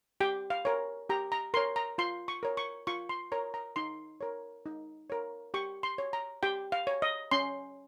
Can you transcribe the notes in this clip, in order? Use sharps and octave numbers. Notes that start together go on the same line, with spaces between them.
G4 G5
F5
A#4 C#5
G4 A#5
A#5
A#4 C#5 C6
A#5
F4 C6
C#6
A#4 C#5
C#6
F4 C#6
C6
A#4 C#5 A#5
A#5
D#4 C6
A#4 C#5
D#4
A#4 C#5
G4 C#6
C6
C#5
A#5
G4 G5
F5
C#5
D#5
C#4 C6